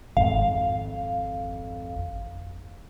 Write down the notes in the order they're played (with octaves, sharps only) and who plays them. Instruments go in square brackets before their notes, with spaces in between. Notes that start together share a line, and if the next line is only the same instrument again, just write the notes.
[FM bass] G#1 [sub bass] F2 [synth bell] F5